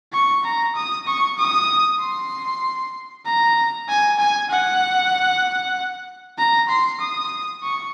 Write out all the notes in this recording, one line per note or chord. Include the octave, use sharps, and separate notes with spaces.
C#6
A#5
D#6
C#6
D#6
C6
A#5
G#5
G#5
F#5
A#5
C6
D#6
C#6